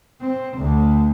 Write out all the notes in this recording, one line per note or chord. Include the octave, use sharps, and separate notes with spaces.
C4
D2